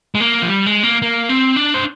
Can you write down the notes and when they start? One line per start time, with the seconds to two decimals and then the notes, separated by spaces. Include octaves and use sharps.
0.15 G#3
0.20 A#3
0.42 F3
0.48 G3
0.66 G#3
0.83 A#3
1.02 A#3
1.29 C4
1.56 D4
1.74 C5